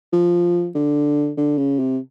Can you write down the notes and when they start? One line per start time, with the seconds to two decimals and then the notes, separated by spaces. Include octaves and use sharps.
0.13 F3
0.75 D3
1.37 D3
1.58 C#3
1.79 C3